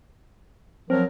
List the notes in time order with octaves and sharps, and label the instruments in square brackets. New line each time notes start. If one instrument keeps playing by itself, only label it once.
[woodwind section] F3 F#3 A#4 [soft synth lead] C4